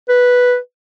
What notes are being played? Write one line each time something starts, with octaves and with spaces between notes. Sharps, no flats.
B4